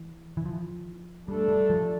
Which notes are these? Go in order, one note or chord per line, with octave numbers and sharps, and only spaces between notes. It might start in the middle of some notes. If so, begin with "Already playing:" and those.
Already playing: E3
E3
F3
G3 A3 D4 A4
G3
F3